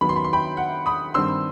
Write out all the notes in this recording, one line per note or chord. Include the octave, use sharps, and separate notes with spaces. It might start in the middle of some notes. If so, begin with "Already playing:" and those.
F#2 D#3 F#3 B3 B5
C6
B5
C6
G5 B5
F#5
B5 D#6
G2 D#3 G3 C4 C6 E6